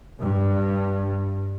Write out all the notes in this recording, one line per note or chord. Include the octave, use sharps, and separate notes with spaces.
G2